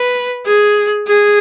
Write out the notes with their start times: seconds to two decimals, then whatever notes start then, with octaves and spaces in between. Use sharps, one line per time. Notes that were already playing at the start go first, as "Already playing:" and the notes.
Already playing: B4
0.46 G#4
1.08 G#4